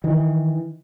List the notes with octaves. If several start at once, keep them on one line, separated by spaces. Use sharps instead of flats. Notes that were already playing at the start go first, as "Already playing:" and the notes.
D#3 E3